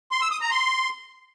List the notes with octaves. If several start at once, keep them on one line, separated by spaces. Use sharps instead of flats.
C6
E6
D#6
A#5
C6